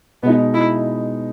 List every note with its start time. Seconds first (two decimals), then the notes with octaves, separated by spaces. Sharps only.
0.23 B2 G#3 B3 D#4
0.54 E4